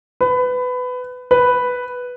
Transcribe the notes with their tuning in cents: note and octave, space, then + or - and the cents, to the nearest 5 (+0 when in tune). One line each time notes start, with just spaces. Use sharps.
B4 +20
B4 +0